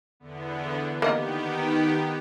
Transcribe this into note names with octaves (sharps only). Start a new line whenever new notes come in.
E2 D3 B3
D#3 A#3 B3 G4 D#5